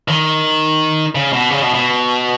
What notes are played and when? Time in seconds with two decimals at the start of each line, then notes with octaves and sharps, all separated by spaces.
0.08 D#3
1.15 C#3
1.32 B2
1.50 C#3
1.62 B2
1.74 B2